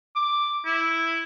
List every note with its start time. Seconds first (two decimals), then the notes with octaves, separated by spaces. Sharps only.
0.16 D6
0.66 E4